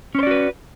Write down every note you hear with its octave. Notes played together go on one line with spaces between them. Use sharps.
C#4 F#4 B4 C5 D5